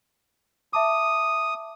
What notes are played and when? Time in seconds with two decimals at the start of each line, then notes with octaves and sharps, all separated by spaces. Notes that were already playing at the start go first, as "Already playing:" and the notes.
0.73 E5 A5 D6 D#6